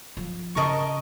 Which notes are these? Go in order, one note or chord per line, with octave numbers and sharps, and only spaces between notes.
F3
C#3 A#4 D#5 A5 C#6